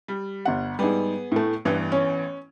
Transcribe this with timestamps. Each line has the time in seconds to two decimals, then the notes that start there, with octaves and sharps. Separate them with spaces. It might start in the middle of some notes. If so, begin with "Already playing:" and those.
0.08 G3
0.45 G1 F#5
0.79 G#2 G3 B3 G#4
1.32 A2 A3
1.65 A1 G2 E3 B3
1.92 C#4